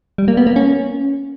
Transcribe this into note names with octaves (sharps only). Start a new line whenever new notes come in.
G3
A#3
B3
A#3
C#4